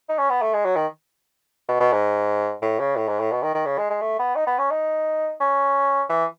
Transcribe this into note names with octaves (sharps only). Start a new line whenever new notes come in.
D#4
C#4
B3
A3
G#3
F#3
D#3
B2
B2
G#2
A2
C#3
A2
G#2
A2
B2
D#3
D#3
C#3
G#3
G#3
A3
B3
D#4
B3
C#4
D#4
C#4
E3